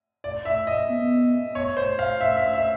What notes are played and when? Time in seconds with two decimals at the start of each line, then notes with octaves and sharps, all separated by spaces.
0.24 D5
0.45 E5
0.67 D#5
0.90 B3
1.55 C#5
1.77 C5
1.99 F5
2.21 E5
2.37 E5
2.53 E5